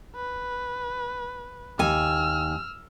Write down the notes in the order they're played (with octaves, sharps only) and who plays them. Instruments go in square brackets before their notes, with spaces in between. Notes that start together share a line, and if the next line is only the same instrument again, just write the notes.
[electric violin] B4
[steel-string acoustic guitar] D#2 G#5 [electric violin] E6 F6